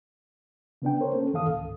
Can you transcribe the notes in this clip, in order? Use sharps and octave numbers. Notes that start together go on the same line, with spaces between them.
C#3 B3 D4 G5
A#4 C5 C#5
A#3 C#4 A4
F#2 D#3 E3 A4 F5 D#6
C#2 G#2